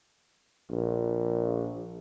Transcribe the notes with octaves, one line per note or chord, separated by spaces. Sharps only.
A#1